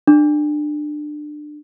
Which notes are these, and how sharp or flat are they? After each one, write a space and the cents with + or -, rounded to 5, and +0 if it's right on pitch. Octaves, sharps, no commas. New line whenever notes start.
D4 +25